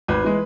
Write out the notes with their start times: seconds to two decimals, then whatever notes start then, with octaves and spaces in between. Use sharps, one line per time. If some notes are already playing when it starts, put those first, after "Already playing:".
0.08 G#1 B4
0.24 E3 G#3